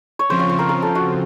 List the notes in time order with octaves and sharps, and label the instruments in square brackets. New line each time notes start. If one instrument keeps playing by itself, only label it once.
[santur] C#5
[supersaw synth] C#3 F3 C4 F4 [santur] C5
[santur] C#5
C5
A#4
A#4
A4
F#4